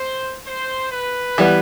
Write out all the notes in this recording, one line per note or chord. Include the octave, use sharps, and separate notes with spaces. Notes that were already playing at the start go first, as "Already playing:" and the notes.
Already playing: C5
C5
B4
E3 G3 B3